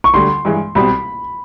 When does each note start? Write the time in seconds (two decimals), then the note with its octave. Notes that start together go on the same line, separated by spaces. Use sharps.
0.04 C#6
0.14 D2 D3 G3 C6
0.45 G2 E3 G#3
0.75 C2 B2 G3 C4 B5